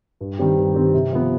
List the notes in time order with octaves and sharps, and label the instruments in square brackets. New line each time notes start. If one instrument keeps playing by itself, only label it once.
[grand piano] G2
D#3 G3 C4 G4
G2
D#3 G3 C4 G4
C3
F3 B3